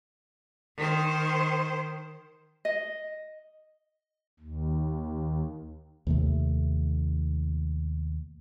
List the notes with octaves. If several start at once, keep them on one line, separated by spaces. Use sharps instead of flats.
D#3 C5
D#5
D#2
D#2 C3 A3